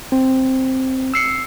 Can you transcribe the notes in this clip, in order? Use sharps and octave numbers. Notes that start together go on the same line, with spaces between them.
C4
E6 C7 C#7